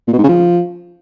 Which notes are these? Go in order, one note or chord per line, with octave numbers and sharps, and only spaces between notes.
A#2
B2
G#2
C#3
F3